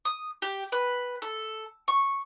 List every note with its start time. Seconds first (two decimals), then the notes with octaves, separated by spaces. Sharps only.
0.05 D#6
0.42 G4
0.72 B4
1.22 A4
1.88 C#6